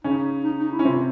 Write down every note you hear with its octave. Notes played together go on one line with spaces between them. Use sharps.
C#3 C#4 D#4
D#4
D#4
E4
C#4
C3 C4 F4